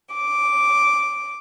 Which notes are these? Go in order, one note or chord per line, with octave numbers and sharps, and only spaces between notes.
D6